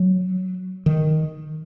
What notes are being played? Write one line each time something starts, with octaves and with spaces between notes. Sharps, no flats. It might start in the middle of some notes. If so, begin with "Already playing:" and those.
Already playing: F#3
D#3